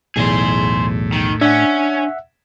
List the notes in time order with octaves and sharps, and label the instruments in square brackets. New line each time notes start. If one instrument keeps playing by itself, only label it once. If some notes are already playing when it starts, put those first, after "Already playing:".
[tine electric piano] B1 E2 [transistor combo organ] A2 [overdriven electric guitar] G#4 C5
[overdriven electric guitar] D#3
[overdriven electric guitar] C#4 [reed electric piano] D4 [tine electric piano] E5 F#5